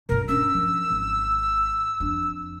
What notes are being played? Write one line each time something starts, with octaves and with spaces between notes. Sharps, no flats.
G2 B2 A#4
C#4 D4 E6
F3
G#1
F2 D4